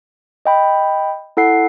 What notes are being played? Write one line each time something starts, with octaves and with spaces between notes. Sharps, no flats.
D#5 G5 B5
E4 A4 F#5 C7